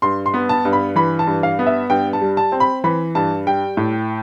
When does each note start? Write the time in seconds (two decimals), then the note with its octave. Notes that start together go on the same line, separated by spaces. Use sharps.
0.02 G2 C6
0.26 C6
0.34 B3
0.49 A5
0.65 G2
0.73 B5
0.96 E3 B5
1.19 A5
1.27 G2
1.43 F5
1.59 B3
1.67 E5
1.90 G2 G5
2.13 A5
2.21 G3
2.37 A5
2.52 C4
2.60 B5
2.84 E3 B5
3.15 G2 A5
3.46 G3 G5
3.77 A2